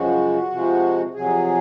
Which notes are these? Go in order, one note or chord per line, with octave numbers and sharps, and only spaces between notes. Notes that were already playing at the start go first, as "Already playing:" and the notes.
Already playing: F#2 C#3 F3 G#3 F#4
C3 F3 G#3
F2 C3 F#3 G#4